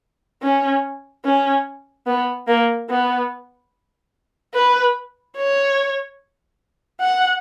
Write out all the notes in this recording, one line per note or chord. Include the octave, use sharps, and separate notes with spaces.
C#4
C#4
B3
A#3
B3
B4
C#5
F#5